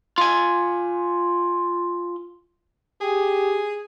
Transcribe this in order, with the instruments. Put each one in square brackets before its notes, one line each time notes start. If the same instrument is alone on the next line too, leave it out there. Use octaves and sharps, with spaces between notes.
[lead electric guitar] F4 G#5
[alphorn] G4 [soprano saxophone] G#4